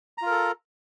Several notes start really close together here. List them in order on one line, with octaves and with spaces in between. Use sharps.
A#5 F4 A#4 A4